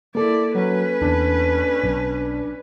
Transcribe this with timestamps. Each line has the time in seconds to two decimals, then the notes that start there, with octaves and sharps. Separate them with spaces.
0.15 A#3 E4 A4 D5
0.55 F#3 C#4 B4
1.02 E2 D4
1.84 B1